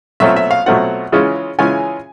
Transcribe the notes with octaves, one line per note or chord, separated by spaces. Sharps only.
B2 F#3 A3 C4 F4 E5
E5
F5
B2 F#3 A3 C4 F4 F#5
C#3 E3 G#3 C#4 F4
C#3 E3 G#3 C#4 F4 G#5